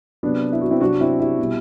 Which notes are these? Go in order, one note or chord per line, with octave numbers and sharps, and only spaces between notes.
C3 F#3 B3 D4
E4
F#4
C4 E4
C3 F#3 D4 F#4
C4 E4
E4 G4
B2 G3